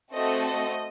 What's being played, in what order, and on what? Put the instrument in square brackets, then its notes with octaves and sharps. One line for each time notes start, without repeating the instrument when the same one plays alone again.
[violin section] A3 C4 F#4 A4 D#5
D#5